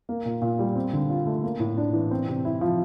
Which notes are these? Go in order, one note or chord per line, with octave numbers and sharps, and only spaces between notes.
A#3
A#2
A#2
G3
C4
D3
F4
A3
A#3
A2
D4
E3
C4
C3
E4
F3